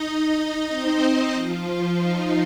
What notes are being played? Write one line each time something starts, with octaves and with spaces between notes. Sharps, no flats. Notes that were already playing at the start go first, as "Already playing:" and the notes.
Already playing: D#4 D#5
C4 C5
F3 F4
D#4